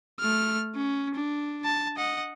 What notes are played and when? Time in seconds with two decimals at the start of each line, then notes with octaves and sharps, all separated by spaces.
0.19 A3 F6
0.75 C#4
1.15 D4
1.64 A5
1.97 D#5 F#5